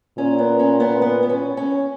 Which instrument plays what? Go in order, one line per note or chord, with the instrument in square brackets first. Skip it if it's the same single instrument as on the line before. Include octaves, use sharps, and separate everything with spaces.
[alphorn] A#2 [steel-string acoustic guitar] C#4
[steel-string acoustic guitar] B3
C#4
B3
B3
B3
C#4
C#4